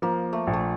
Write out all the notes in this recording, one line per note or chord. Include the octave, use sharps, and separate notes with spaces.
F3 A#3
A3
A#1
A3